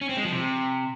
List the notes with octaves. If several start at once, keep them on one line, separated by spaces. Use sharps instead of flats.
C#4
C4
G#3
F3
C3